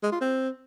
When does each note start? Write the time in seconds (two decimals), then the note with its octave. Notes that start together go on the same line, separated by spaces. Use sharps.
0.03 G#3
0.12 F4
0.21 C4